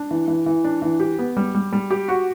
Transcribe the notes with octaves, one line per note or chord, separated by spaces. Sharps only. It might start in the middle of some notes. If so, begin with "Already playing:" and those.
Already playing: D4
E3
E3
E3
D4
E3
G4
B3
G3
G3
G3
G4
F#4